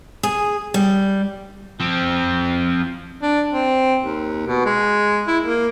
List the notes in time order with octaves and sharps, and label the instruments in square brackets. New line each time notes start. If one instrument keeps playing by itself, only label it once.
[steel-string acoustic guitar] G#4
G3
[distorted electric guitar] F3 C4
[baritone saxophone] D4
C4
D#2
B2
G#3
E4
A#3